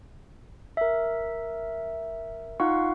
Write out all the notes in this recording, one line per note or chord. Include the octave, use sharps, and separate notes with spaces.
A#4 E5
D#4 F4 F5 F#5 C#6